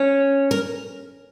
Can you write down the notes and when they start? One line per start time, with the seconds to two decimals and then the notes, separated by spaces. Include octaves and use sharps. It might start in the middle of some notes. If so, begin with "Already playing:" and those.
Already playing: C#4 C#5
0.51 A#4